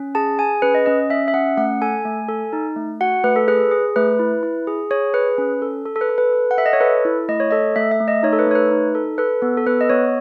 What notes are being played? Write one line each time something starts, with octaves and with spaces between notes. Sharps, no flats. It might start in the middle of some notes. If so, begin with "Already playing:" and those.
Already playing: C#4
G#4 A5
G#4 G#5
C#4 B4
D#5
C#4 D#5
C#4 E5
E5
C#4 F#5
A3 F#5
A4 G#5
A3
A4
D#4
A3
F#4 F#5
A3 B4
A4
G#4 B4
G#4
A3 B4
E4
E4
G#4
G#4 C#5
G#4 B4
C#4
A4
A4
A4
B4
A4
B4
A4
F#5
A4 E5
D#5
C#5
A4 B4
E4
A3 D#5
C#5
A4 D#5
A3 E5
E5
A3
D#5
D#4 C#5
A4
B4
A3 C#5
B4
D#4
A4
A4 B4
B3
A4
B3 B4
D#5
B3 C#5